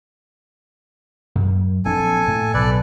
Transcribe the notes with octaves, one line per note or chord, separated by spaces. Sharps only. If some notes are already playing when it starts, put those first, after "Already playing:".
F#2
A#1 C4 D4 A4 G#5
A2
B1 A4 B4 D5